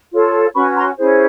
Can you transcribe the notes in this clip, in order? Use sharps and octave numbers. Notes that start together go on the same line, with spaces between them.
F4 A4 C#5
C#4 F#4 B4 B5 C#6
A#5 C6
C#4 E4 G#4 C5